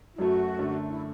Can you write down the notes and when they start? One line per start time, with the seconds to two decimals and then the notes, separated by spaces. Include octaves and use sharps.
0.14 E4
0.18 F#2 F#3 A3 F#4
0.58 F#2 D3 A3 D4
0.90 E4